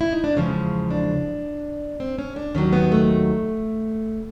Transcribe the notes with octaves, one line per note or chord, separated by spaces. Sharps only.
E4
D#4
D4
E2 C#3 F3 G#3 C#4
D4
C4
C#4
D4
D#2 D#3 F#3 C#4
B3
A3